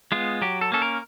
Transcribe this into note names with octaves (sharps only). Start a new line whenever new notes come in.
G#3 B3 F4
F#3 G4
A4
A#3 C#4 A4
A#4